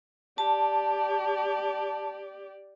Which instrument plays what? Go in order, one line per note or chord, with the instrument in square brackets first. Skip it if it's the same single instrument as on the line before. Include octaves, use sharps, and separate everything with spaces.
[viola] G4 D5 [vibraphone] A5